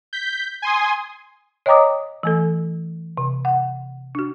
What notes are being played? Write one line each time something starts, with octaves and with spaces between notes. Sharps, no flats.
G6 B6
G#5 C6 D#6
C#5 D#5 G5 A#5 D6 D#6
E3 A3 A4
C3
F#5
D4 F#4